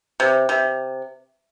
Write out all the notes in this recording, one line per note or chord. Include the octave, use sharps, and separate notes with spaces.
C3
C3